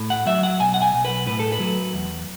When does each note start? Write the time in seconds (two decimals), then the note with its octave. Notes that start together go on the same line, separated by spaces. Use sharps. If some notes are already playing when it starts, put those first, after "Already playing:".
Already playing: A2
0.10 F#5
0.27 F#3 E5
0.43 F#5
0.60 B1 G#5
0.74 F#5
0.82 G#5
0.93 B1
1.05 B4
1.27 A2 B4
1.39 A4
1.52 B4
1.60 F#3
1.94 E2